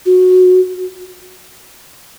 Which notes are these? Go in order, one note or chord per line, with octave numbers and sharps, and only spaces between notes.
F#4